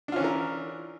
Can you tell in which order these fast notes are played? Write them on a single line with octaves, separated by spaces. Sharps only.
D4 F4 C#4 E3 A#4